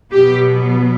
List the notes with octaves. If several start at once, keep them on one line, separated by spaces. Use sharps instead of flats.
B2 F#3 B3 G4